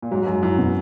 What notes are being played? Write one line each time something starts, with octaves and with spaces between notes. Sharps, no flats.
A#2
G#2 F#3
G#2
F#2 F#3
F#2 E4
B2